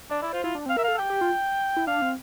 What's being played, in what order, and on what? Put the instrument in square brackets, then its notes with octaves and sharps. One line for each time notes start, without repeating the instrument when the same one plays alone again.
[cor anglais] D4 [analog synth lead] D5
[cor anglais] E4 [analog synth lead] D5
[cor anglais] F4 [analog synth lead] C5
[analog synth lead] E4 [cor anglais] F4
[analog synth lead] D4
[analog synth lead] C4 [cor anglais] F5
[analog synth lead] A#4 [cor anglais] E5
[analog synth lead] A4 [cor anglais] F5
[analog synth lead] A4
[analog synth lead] G4 [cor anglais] G5
[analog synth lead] G4
F4
E4
[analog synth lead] D4 [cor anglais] F5
[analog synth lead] C4